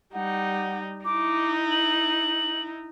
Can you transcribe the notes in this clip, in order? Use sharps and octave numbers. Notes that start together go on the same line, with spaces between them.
G3 D#4 F#5
D#4 E4 D6
F#7